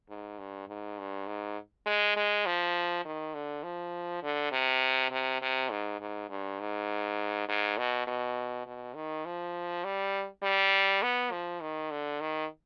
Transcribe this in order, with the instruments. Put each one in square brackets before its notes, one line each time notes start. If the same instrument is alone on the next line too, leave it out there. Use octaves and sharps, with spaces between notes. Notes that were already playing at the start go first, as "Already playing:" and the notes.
[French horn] G#2
G2
G#2
G2
G#2
G#3
G#3
F3
D#3
D3
F3
D3
C3
C3
C3
G#2
G#2
G2
G#2
G#2
B2
B2
B2
D#3
F3
G3
G3
B3
F3
D#3
D3
D#3